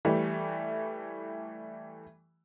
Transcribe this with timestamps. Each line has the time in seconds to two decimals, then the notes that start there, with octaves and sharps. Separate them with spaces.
0.05 E3 G3 A3